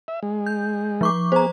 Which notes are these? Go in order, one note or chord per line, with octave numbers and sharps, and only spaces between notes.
E5
G#3
G6
F3 C#6 D6
B3 G#4 C5 A#5